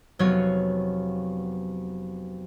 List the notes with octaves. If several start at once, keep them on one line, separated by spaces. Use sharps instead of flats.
F1 F#3 B3 C#5 F5